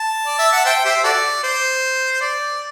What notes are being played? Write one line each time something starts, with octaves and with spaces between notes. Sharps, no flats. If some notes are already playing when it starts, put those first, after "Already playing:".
Already playing: A5
D5
E5
F#5
C5 E5 G5
G4 C5 E5
F#4 A4 D5
C5
D5